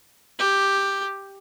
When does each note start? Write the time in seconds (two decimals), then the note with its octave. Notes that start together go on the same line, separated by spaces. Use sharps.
0.39 G4